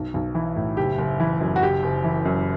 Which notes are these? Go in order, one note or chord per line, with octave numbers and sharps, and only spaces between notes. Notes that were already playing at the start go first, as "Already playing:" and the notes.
Already playing: B1
B1
E3
A2
F#1 G4
F#1
E3
F#2
F#4
F#1 G4
F#1
E3
F#2